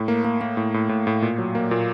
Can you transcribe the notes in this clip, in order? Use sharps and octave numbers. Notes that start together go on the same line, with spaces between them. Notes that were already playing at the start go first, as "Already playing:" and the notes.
Already playing: A2
A#3
A#3
A#3
A2
A2
A2
A2
A#2
F#3
A#3
A#2